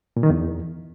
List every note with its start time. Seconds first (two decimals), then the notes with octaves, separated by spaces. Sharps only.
0.17 A#2
0.23 D#3
0.30 E2